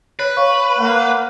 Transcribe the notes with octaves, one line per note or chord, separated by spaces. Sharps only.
B4 C#5
C#5 F5 C#6
A#3 F#5